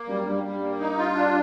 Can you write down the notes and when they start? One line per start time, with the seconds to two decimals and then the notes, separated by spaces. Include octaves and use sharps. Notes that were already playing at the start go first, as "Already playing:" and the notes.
Already playing: A#3
0.08 F#2 G3
0.26 G2 G3
0.43 G3
0.62 A#3
0.79 D#4
0.98 F4
1.15 D4